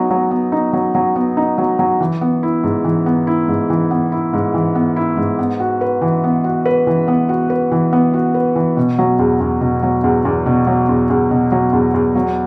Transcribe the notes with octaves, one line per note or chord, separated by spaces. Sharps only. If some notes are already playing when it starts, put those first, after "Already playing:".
Already playing: F#3 B3 D#4
F#3
B3
D#4
F#3
F#3
B3
D#4
F#3
F#3
E3
B3
E4
G#2
E3
B3
E4
G#2
E3
B3
E4
G#2
E3
B3
E4
G#2
B3
F#4
B4
E3
B3
F#4
B4
E3
B3
F#4
B4
E3
B3
F#4
B4
E3
B2
F#3
E2
E2
B2
F#3
E2
E2
B2
F#3
E2
E2
B2
F#3
E2
E2
F#3